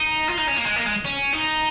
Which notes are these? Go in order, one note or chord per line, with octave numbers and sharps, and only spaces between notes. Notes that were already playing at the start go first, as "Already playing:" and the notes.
Already playing: D#4
F4
D#4
C#4
A#3
G#3
A#3
G#3
C#4
D#4